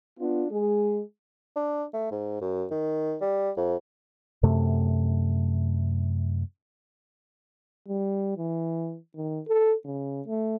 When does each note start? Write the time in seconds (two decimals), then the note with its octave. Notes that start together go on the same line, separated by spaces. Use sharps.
0.18 B3 D4 F4
0.50 G#3 G#4
1.56 D4
1.93 A3
2.11 G#2
2.41 F#2
2.71 D#3
3.21 G3
3.57 F2
4.43 F#2 C3 A3
7.88 G3
8.37 E3
9.16 D#3
9.48 A4
9.85 C#3
10.27 A3